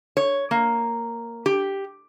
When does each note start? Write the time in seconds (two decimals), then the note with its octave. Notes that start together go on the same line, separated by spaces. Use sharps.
0.17 C#5
0.51 A#3
1.46 G4